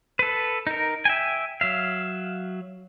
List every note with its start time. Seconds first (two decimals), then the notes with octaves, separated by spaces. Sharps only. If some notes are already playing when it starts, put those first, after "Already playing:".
0.19 A4 B4
0.67 D#4 A#4
1.05 E5 G5 G#5
1.61 F#3 E5 F5